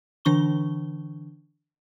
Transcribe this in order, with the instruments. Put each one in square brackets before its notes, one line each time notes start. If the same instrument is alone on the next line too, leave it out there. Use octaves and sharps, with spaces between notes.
[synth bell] D3 E3 D4 C#6 G7